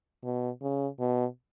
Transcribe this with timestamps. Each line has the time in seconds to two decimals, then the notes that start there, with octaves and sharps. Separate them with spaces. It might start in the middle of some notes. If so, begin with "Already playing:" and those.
0.24 B2
0.62 C#3
0.99 B2